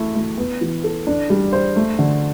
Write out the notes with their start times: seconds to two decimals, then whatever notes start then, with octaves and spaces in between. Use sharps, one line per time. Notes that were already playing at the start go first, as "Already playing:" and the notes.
Already playing: A3 E4
0.15 A3
0.38 B3
0.61 E3
0.84 A4
1.07 D4
1.30 G3
1.53 C5
1.76 A3
1.99 D3